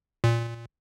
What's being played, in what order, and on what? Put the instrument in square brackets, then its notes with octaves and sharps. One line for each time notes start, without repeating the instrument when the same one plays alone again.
[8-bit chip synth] A#2